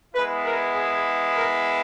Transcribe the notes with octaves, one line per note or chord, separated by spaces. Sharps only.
G#3 B3 E4 B4
A#4
G#4
A#4